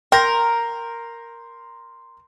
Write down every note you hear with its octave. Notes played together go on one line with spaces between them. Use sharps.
A#4 G5 C6 G6 A#6